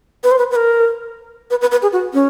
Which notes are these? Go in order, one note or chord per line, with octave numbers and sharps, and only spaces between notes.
B4
C5
B4
B4
A#4
B4
B4
B4
G#4
F#4
C#4